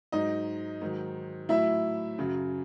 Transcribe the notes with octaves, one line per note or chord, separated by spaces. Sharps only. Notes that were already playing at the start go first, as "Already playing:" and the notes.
G#2 F#3 D#4 D#5
G#2 D#3 F#3
A2 F#3 E4 E5
F#2 C#3 F#3